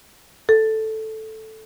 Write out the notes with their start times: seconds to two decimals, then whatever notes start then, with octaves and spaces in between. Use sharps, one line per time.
0.49 A4